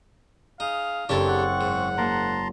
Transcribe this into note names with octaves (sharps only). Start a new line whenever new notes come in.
D#4 G#4 F5
F#1 C4 D4 G4 A4 C#6 G#6 A6
F#5
G#2
A#3 F#4 A5 A#5 C6